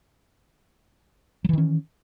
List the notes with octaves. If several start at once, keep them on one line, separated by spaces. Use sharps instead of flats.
D#3 E3 F#3 C#4